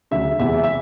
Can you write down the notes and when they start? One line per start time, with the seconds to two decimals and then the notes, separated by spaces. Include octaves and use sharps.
0.11 D2 C#3 F#3 E5
0.40 E2 C3 E3 G#3 E5
0.64 E5